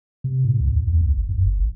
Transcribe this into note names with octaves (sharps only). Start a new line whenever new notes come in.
C3
A2
C#2
D#2
E2
C#2
G#1
F#2
G1
A1